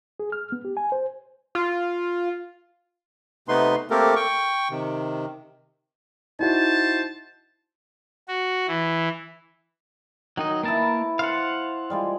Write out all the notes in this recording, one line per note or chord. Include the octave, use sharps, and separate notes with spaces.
G#4
F6
B3
G4
G#5
C5
F4
C3 A3 B3 D#4 B4 C6
A3 A#3 C4 G4 A4 A#4
G5 C#6
C3 D#3
D#4 E4 F#4 C5 A5
F#4
E3
D#3 F#3 D#4 D#5
A#3 E4 A#4 B4 A5
C5 F5 F#5 A5
G3 G#3 F4